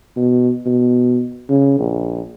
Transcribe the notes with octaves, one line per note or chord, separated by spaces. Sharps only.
B2
B2
C#3
A#1